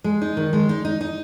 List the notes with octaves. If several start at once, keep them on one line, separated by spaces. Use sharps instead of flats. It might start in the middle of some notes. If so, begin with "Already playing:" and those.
G#3
D#4
D#3
G#3
D#4
D#4
D#4